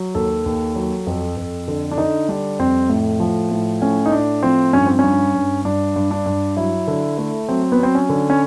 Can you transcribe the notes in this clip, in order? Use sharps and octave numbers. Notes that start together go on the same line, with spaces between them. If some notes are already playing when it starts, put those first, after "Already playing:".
Already playing: F#3
D#2 A4
D#2
F#3
F2
F2
D3
D4
D3 D#4
G3 D4
F2 C4
A2
F3
A2
A2 C#4
D#4
A2 D4
F3 C4
G2 C#4
C4
C#4
G2
G2
G2 D4
G2
D4
G2
F#3 E4
D3
A3
F#3 C4
B3
F#3 C4
C#4
D3
C#4